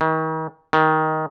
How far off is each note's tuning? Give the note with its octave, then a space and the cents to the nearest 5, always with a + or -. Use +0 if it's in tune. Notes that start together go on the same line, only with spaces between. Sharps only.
D#3 +35
D#3 +10